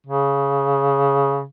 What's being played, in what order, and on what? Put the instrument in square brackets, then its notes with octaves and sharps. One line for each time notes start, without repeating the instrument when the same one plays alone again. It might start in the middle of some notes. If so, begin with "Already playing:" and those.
[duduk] C#3